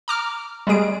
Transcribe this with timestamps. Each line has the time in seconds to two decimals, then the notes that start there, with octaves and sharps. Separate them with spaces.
0.08 A#5 D6 F6
0.67 G3 G#3 G#4 D7